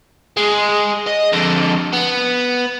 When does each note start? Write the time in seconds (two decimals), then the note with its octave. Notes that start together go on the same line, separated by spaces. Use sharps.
0.37 G#3
1.07 D#5
1.33 F2 D3
1.93 B3